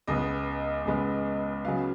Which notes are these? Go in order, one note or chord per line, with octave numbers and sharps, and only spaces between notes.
C#2 C#3 G#3 B3 D#5
C#2 C#3 G#3 B3
C#3 F#3 B3 F5